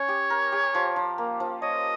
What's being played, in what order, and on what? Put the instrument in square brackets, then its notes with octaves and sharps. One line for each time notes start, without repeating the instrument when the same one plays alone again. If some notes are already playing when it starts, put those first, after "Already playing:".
Already playing: [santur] C#4 [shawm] C#5
[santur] G4
A#4
G4
F3
F3
A#3
F3
[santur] C#5 [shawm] D#5